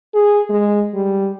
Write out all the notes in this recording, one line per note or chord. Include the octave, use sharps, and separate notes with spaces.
G#4
G#3
G3